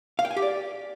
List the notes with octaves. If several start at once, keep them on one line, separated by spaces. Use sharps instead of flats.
F5
G5
G#5
G4
D5